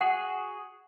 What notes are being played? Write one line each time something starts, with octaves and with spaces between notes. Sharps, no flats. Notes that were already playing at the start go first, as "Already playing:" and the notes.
F#4 G#4 F#5